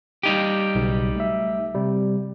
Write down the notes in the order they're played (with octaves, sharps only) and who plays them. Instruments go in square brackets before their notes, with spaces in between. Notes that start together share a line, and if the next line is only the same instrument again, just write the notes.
[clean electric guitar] G3 D#4 G4
[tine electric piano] B1 C#3
A3 E5
C3 G3